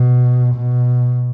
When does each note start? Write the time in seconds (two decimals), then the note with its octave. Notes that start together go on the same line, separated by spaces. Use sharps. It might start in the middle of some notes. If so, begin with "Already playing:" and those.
Already playing: B2
0.55 B2